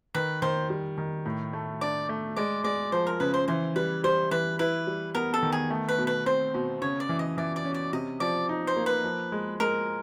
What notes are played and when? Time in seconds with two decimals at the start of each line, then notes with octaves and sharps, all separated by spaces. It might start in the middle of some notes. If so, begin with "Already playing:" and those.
0.15 D#3 B4
0.42 D#3 C5
0.70 G3
0.98 D#3
1.26 A2
1.53 A3
1.81 D4 D5
2.09 A3
2.36 G#3 D5
2.64 G#3 D5
2.92 F3 C5
3.07 A#4
3.20 C#3 B4
3.34 C5
3.48 E3 C5
3.76 G3 B4
4.04 G3 C5
4.31 E3 B4
4.59 E4 B4
4.87 G3
5.15 B3 A#4
5.34 A4
5.43 D#3
5.52 G#4
5.70 A3
5.89 B4
5.98 B2
6.07 B4
6.26 C4 C5
6.54 B2
6.82 C#3 C#5
7.00 D5
7.09 E3
7.19 D#5
7.38 E3 D5
7.56 D5
7.65 C#4
7.74 D5
7.93 C3 D#5
8.20 F3 D5
8.49 D#4
8.67 C5
8.76 A#3
8.86 B4
9.04 F3
9.32 G#3
9.60 G#3 A#4